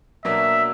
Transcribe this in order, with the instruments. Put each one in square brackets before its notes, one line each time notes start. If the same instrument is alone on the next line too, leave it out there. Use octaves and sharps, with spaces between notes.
[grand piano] B2 F#3 A#3 D4 [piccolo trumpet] E5